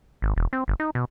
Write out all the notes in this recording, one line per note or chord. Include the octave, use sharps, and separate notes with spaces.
G#1
E1
C4
G1
D#4
B2